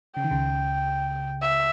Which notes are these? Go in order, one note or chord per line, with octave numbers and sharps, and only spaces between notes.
C#3 G5
D#3
C#2 C#3
E5